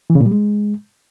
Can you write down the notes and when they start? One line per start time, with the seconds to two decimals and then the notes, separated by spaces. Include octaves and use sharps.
0.10 E3
0.15 C#3
0.20 A#2
0.26 G3
0.31 G#3